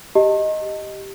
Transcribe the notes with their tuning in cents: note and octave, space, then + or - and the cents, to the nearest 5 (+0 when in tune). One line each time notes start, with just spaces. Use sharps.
G4 +0 D#5 +0 A5 +35